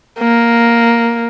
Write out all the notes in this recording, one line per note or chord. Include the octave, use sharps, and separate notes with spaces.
A#3